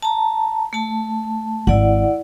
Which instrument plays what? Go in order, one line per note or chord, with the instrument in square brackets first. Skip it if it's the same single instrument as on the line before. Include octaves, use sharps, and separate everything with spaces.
[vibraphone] A5 A#5
A3 A5
[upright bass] G#1 [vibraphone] E4 D5 F#5